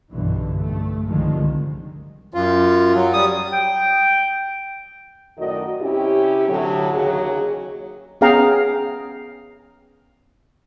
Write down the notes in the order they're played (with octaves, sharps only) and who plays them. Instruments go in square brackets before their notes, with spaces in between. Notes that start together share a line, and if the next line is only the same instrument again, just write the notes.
[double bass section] B1 G2 B2 D3 E3
G2 A3
C2 D3 D#3 F3 G#3
[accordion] F#2 F4
F#3
G3 D#6
[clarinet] G5
[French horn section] F#2 A2 D#3 F#4 D5 D#5
C3 C#4 E4 G4
A2 D3 F#3
D#2 C#3 F#3 G#4
[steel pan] B3 C#4 G#4 F5 G5 A#5